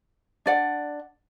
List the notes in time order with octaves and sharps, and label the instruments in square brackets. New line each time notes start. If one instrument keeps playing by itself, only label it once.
[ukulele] D4 D5 F#5